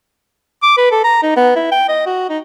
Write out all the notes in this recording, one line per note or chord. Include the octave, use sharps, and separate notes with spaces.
D6
B4
A4
A#5
D#4
B3
E4
G5
D#5
F#4
D#4